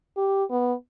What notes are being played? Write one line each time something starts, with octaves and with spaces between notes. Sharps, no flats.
G4
B3